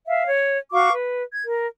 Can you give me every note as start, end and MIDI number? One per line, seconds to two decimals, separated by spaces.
0.07 0.28 76
0.07 0.28 77
0.28 0.57 73
0.72 0.91 66
0.72 0.91 77
0.72 0.91 85
0.72 0.91 86
0.92 1.22 71
1.32 1.44 92
1.45 1.65 70